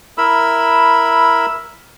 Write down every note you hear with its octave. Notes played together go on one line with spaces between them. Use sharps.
E4 A#4 B5 E6